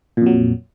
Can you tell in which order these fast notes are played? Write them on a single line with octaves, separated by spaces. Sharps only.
A#2 F2 F#3